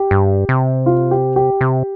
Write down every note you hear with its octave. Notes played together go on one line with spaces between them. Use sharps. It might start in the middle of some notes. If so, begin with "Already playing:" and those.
Already playing: G4
G2
C3
F4
G4
G4
C3